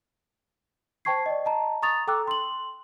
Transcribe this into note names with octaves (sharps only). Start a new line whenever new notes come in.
C5 G5 A5 C#6 G#6 C7
D5 D#5
D#5 A5 A#5
A#5 C#6 D#6 A6 F7
A4 G5 A#5 D6 E6 F#6
C6 F#7